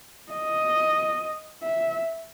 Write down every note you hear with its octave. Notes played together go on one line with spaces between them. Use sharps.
D#5
E5